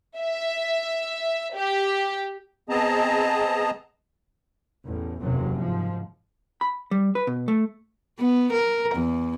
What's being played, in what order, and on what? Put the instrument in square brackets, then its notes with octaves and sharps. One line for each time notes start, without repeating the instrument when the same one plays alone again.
[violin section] E5
G4
[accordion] B3 C4 G#4 D#5 A5 A#5
[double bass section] A1 E2
F#1 E2 C3 F#3
G#2 F3
[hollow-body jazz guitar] B5
G3
B4
B2
A3
[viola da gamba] B3
A#4
E2